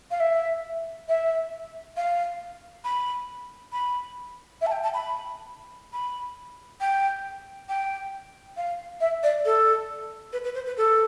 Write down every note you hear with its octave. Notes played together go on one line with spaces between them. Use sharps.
F5
E5
E5
F5
B5
B5
E5
A5
G5
A5
B5
B5
G5
G5
F5
E5
D5
A4
B4
B4
C5
B4
A4